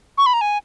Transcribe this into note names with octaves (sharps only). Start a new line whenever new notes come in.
C#6
B5
A#5
G#5